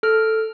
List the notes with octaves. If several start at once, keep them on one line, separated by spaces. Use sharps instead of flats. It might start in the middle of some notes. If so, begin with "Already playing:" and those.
A4 F6